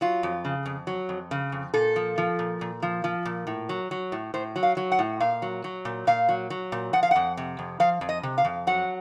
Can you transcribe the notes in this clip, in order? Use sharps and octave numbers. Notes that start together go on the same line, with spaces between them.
F#3 F4
F2
C#3
F2
F#3
F2
C#3
F2
A#2 A4
F3
F3
A#2
A#2
F3
F3
A#2
A2
F#3
F#3
A2
A2 C5
F#3
F5
F#3
F#5
A2
A#2 F5
F#3
F#3
A#2
A#2 F5
F#3
F#3
A#2
F3 F#5
F5
F2 F#5
C3
F2
F3 F5
F2
D#5
C3
F5
F2
F#3 F#5